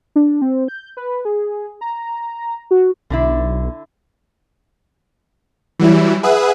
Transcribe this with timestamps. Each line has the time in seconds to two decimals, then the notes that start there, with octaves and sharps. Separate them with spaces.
0.16 D4
0.42 C4
0.68 G6
0.97 B4
1.25 G#4
1.81 A#5
2.71 F#4
3.10 B1 D3 D4 E4
5.79 E3 F#3 G3 E4
6.23 G#4 B4 E5 F#5 D#6